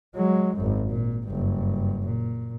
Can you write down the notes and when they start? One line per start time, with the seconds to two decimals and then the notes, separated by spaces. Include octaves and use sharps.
0.16 F#3 G#3
0.56 G#1 F#2
0.88 A#2
1.27 F#1 G2
2.05 A#2